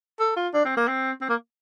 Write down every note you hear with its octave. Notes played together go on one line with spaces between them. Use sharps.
A4
F4
D4
C4
A#3
C4
C4
A#3